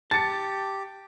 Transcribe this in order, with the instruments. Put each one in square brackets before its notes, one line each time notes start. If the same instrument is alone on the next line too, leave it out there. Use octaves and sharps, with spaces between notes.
[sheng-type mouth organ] G4 [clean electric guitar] A5 [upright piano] A6 C#7